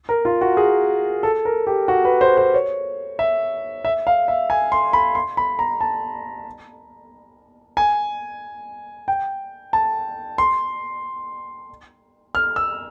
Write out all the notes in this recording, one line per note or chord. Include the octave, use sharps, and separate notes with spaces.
A#4
F4
F#4
G#4
A4
A#4
G4
F#4
B4
C5
C5
C#5
E5
E5
F5
E5
G#5
C6
B5
C6
B5
A#5
A5
G#5
G5
A5
C6
F6
E6